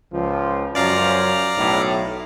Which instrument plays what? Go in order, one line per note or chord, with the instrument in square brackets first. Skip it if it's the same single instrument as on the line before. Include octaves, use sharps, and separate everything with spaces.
[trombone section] C#2 F3
[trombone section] F#2 F3 C#4 [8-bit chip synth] D5 F5 A#5
[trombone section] B1 A2